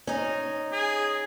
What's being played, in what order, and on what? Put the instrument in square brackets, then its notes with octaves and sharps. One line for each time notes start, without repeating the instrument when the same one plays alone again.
[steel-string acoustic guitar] C#4 D#4
[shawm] G#4